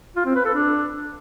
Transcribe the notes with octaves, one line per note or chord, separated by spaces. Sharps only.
F4
C4
B4
A4
D4